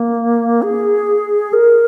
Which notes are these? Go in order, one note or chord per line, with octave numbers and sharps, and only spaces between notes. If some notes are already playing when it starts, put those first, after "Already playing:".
Already playing: A#3
G#4
A#4